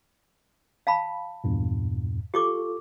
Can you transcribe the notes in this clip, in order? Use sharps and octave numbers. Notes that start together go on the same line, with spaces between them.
F5 A5 B5
E2 G2 A#2
F4 G4 A4 C#6 D6